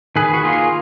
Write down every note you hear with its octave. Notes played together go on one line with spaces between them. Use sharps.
D#3 G#4 B4
F#4
A#3 F4 G#4